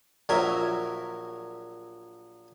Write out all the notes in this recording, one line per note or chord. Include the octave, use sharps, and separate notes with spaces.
A#1 F#3 A#4 E5 G#5